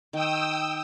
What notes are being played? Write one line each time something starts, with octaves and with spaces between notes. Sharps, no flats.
D#3 G5 D#6 E6